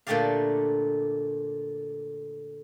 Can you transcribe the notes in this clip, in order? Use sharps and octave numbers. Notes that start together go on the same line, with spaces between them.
A#2 D3 A3 G4 D5 F5